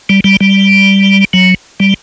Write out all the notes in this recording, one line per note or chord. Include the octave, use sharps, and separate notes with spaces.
G3
G3
G3
F#3
G3